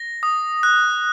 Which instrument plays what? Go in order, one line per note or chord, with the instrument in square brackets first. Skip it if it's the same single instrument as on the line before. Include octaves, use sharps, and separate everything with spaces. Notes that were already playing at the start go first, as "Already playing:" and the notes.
Already playing: [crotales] A#6
D#6
F#6